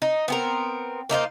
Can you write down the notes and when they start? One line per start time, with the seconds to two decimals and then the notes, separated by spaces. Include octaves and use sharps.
0.02 D#4
0.28 B3 C4 A#4
1.10 A#3 D#4 F4 C5